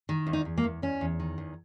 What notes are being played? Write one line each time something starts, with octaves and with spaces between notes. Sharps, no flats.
D#3
E2
D#4
E2
A#3
E2
E2 C#4
E2
D#3
E2